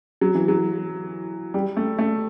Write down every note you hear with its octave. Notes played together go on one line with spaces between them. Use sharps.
F#3
E3
F#3
G3
A3
A3